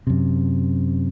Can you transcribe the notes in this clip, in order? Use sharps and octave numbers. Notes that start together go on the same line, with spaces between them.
F#2 C3